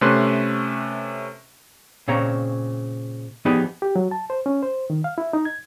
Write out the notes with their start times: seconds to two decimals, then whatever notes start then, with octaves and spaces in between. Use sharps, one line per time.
0.01 C3 A3 C#4 B4 C6 F#6
2.08 A#2 C#3 C4 C#5 A#5
3.45 F3 B3 D#4 G4 G#4 D5
3.82 G4
3.96 F#3
4.11 A5
4.30 C5
4.46 C#4
4.63 C5
4.90 D#3
5.04 F5
5.18 E4
5.33 D#4
5.45 G#6